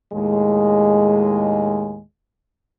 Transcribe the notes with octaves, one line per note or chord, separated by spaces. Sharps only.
D#2 A2 G#3